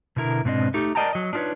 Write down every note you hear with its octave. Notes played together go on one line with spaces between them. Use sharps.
B2 D3 E4 A#4
G#2 B2 C4 D4 D#5
A3 D#4 G4
A#4 D5 D#5 G5 A5 A#5
F#3 D#5
D4 D#4 F4 A#4 B4 C#5